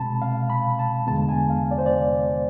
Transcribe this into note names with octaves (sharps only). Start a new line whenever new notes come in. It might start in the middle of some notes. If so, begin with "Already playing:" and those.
Already playing: B2 G#3 C4 A5 B5
F5
B5
A5
E2 D3 G#3 B3 A5
G#5
F5
D5
C5
D5